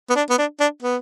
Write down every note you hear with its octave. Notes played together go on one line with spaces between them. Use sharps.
B3
D4
B3
D4
D4
B3